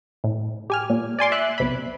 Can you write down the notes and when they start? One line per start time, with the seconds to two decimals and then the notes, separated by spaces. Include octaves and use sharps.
0.24 A2
0.70 G4 G#5 F6
0.90 A#2
1.19 D5 G#5 C6 D6
1.32 E5 F#6
1.58 B1 C3 B5